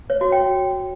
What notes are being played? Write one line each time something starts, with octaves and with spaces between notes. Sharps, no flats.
C#5
F#4
G5